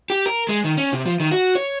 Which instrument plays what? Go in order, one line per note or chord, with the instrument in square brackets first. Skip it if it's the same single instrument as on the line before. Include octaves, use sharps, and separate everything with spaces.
[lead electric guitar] G4
A#4
G#3
D#3
C#4
C3
F3
D#3
F#4
C#5